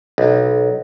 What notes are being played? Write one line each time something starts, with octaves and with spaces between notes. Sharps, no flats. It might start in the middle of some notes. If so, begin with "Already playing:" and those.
B1